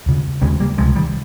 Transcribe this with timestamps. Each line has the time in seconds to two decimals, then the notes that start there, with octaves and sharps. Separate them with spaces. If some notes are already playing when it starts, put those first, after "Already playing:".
0.06 D#2 C#3
0.42 D#2 C#3 G#3 C4
0.60 G3 A#3
0.78 C#2 C3 F3 G#3
0.96 D#3 G3